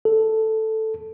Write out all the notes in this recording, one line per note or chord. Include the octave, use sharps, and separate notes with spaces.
A4